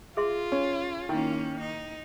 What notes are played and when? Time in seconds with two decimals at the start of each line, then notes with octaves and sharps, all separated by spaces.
0.17 F4 G#4 E5 C6
0.52 C#4
1.09 D#3 A#3 C#4 E4
1.60 D#4